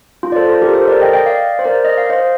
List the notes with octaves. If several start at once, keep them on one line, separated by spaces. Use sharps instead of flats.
F4
D5
A4 C5
F4 A4
G4 A#4
A4 C5
A#4 D5
D#5 G5
D#5 G5
D5 F5
C5
A#4 D5
D#5
F5
C5 D#5